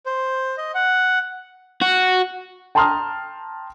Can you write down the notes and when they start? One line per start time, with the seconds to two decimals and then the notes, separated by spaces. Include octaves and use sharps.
0.06 C5
0.58 D#5
0.75 F#5
1.82 F#4
2.75 G5 A5 A#5 C6 D#6 F6